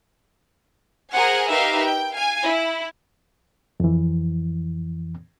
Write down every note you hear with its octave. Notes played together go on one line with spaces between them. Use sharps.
G#4 A#4 C5 F#5 G#5
D#4 G4 A#4 B4 E5 F5
G5
F5 G#5
E4
F2 E3